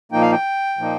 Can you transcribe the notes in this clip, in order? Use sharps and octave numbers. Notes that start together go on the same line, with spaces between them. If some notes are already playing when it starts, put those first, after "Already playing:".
A#2 F3 A#3 D#4 G5
F5
G5
A#2 F3 A#3 D#4